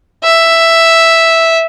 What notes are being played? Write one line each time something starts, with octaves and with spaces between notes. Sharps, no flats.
E5